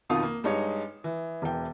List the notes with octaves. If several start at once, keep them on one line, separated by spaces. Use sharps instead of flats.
F2 B2 D#3 F4 F5 D#6
A#3
G2 G#3 D#4 C#5
E3
E1 E3 G5